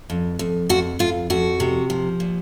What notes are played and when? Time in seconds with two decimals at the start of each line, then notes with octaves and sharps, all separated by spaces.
0.10 F2
0.39 F2
0.69 F2 F#4
0.99 F2 F4
1.30 F2 F#4
1.60 C3
1.90 F3
2.20 A#2